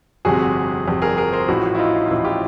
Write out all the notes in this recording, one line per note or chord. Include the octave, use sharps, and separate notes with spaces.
G1 F2 C3 F#4 G#4
G1 F2 C3
G#4 A#4
G#4 A#4
A#4 C5
A1 A2 F3 E4 F#4
E4
D#4 F4
F4
A1 A2 F3 E4
F4 G4